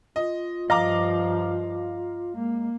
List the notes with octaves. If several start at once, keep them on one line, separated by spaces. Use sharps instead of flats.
F4 D#5
G2 F3 D#5 F5 A#5 D6
G#3 A#3